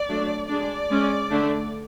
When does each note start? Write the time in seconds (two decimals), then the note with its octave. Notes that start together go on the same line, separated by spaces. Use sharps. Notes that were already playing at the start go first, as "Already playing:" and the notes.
Already playing: D5
0.08 F#3 A3 D4
0.48 G#3 D4 D5
0.90 G#3 C#4
1.30 D3 A3 D4